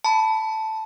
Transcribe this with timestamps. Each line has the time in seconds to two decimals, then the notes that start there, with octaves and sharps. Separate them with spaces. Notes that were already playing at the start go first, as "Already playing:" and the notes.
0.04 A5 B5